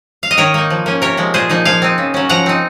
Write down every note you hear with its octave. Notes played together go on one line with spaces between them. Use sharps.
F5
D#5
D#3 A#4 C#5
A#3 D#4
F3
A#3 C#4
C3 A#4 C#5
F3 G#3
A#2 G#4 C5
F3 A#3 D#4
F3 F5 G#5
C4 D#4
C#3
F#3 C#4
F3 F#5 A#5
C4 D#4